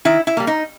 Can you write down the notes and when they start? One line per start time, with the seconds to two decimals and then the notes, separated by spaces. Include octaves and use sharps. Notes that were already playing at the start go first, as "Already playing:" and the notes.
0.05 D#3 E4
0.27 E4
0.37 G3 A#3
0.47 D#4